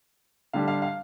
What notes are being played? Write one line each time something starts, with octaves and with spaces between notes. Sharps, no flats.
D3 G3 D4 F5
F5
F5